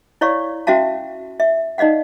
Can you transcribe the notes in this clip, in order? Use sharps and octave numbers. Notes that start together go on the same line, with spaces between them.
E4 C#5 D5 F5 C#6
C#4 F#4 E5 F5 A5
E5
D#4 D5 D#5 F5 F#5